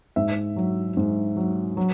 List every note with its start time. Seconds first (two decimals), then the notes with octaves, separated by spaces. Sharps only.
0.16 G#2 E5
0.56 F#3
0.97 G#2
1.37 F#3
1.77 F#3